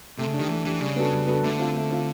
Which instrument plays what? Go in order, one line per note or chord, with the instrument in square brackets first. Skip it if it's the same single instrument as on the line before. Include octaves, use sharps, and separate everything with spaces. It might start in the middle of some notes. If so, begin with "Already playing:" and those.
[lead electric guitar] C3 [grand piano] A3
[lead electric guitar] C#3
[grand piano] D4
[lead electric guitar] D#3 [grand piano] G4
[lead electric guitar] E3 [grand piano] A3
[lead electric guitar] E3 [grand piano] D4 G4
[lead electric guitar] C#3 [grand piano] G3
[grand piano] B3 D4 F#4 A4
G3
B3 D4 F#4 A4
[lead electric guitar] D3 [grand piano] A3
[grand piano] C4 F4
A3
C4 F4